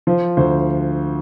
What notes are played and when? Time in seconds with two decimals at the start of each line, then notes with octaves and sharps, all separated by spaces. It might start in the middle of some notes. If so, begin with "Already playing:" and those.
0.07 F3 C5
0.37 D2 C5